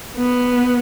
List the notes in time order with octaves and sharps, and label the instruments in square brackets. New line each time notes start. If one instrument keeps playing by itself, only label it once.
[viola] B3